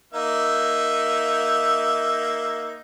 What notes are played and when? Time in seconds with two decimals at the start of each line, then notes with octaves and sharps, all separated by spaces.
0.14 A#3 D#4 E5